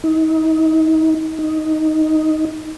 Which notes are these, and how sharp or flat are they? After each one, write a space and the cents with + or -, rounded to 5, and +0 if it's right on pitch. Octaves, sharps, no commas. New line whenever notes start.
D#4 +35
D#4 +5